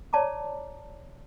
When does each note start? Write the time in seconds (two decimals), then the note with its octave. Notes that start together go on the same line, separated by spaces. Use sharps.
0.13 C#5 D5 A5 A#5 D6